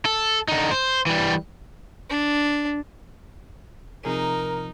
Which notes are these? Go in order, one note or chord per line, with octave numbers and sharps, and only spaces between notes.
A4
D3 D#4
C5
E3 G3
D4
C3 F3 D#4 G#4 A#4